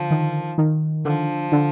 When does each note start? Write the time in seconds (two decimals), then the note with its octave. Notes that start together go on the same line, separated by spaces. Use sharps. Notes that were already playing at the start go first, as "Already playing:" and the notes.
Already playing: D3 F3
0.11 D#3
0.58 D#3
1.05 D3 F3
1.52 D3